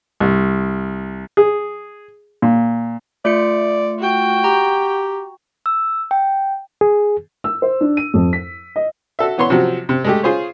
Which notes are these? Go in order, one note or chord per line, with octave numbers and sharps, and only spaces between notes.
C2
G#4
A#2
A3 F4 D5 C#7
F#4 G5
G4 A#5
E6
G5
G#4
E6
C5
D4
D#7
F2
B6
D#5
F#4 A4 E5
E3 B3 C#5 C6
C3 F3 F#3 F#4
C3
G#3 A3 G4
F4 G#4 C5 C#5